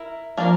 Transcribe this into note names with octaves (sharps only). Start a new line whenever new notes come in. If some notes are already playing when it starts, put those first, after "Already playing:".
Already playing: E4 A#4
F3 A#3 D4 F4 A#4